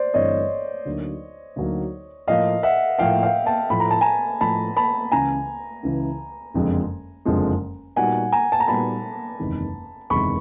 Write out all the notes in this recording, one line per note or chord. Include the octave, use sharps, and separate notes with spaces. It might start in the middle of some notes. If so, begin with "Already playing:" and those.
Already playing: C5 D5
G1 G2 E3 A3 C4 C#5 D#5
D2 D3 F#3 A#3 D#4
D2 D3 F#3 A#3 D#4
A2 F3 A#3 D#5 F5
E5 F#5
A2 F3 A#3 F5 G5
F5 G5
G5 A5
A2 F3 A3 B5
A#5
A5
G#5 A#5
A2 F3 A3 A5 B5
A5 B5
C#2 C#3 E3 G#5 A#5
C#2 C#3 E3
F#1 F2 D3 F3 G#3
F#1 F2 D3 F3 G#3
A#2 G3 B3 D#4 F#4 F#5 G#5
G#5 A#5
A5
A#5
A#2 G3 B3 D#4 F#4 A5 B5
F#1 E2 C3 D#3 G#3
F#1 E2 C3 D#3 G#3 B5 C#6